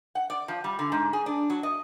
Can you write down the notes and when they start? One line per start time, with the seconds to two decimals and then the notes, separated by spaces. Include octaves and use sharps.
0.15 F#5
0.30 D5
0.48 F3
0.64 G3
0.79 D3
0.92 G#2
1.13 G#4
1.26 D4
1.50 F#3
1.63 D#5